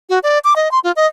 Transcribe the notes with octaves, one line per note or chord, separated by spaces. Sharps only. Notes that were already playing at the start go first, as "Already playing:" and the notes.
F#4
D5
D6
D#5
C6
F4
D#5